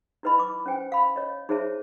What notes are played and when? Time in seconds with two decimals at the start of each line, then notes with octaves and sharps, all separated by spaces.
0.23 D#4 E4 B4 D#5 B5
0.39 D6
0.66 C#4 C5 G5 G#5
0.92 F5 B5
1.16 C#5 D#5
1.49 D#4 G#4 C5 C#5 E5 A5